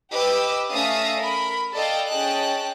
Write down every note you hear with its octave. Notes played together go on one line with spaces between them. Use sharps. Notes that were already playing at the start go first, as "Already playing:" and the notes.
G4 B4 D#5 D6 E6
A3 C#4 E5 F5 D#6 A#6
A#4 B5
A4 D5 D#5 F5 G5
C#4 G#4 D#5 G5 A5 F#6